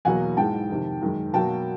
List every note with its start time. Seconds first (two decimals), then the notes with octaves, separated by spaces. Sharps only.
0.05 E2 B2 F#3 A#3 F#5 G#5
0.37 G#2 E3 G#3 G5 A5
0.70 F2 C3 D#3
1.02 F#2 D#3 G#3
1.34 B2 F#3 A#3 G5 A5